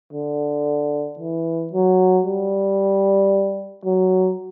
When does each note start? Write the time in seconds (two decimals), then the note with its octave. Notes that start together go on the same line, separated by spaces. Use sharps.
0.13 D3
1.19 E3
1.73 F#3
2.26 G3
3.85 F#3